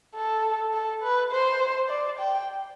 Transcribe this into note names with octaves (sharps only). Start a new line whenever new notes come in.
A4
A4
B4
C5
D5
G5